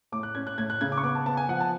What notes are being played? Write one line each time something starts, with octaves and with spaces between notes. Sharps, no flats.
A2 D6
F#6
C#4 G#6
F#6
A2 G#6
F#6
C#3 G#6
D6
C#6
B3 D6
A5
B3 A5
G#5
F3 F#5
A5